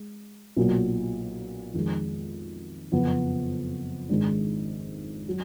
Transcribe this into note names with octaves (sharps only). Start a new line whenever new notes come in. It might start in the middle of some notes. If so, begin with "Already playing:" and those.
Already playing: G#3
B1 A#2 F#3
F2 D#3 G#3
F#1 F2 F3 B3
G#1 G#2 D#3 G#3 D4
F#3